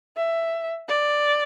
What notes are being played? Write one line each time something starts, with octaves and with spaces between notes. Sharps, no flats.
E5
D5